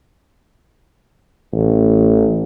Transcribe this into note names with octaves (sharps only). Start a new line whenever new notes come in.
A1